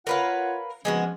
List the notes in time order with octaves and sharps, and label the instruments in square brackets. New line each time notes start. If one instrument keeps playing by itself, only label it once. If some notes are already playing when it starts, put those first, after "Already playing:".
[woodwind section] F4 C#5 F#5 [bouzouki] A#4 B4 F5
[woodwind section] F3 C#4 [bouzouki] G#3 B3 F#4